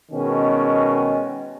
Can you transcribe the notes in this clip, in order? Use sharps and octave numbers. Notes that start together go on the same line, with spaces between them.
B2 D#3 G#3 C#4